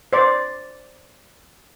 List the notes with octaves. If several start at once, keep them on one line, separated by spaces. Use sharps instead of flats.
C5 D5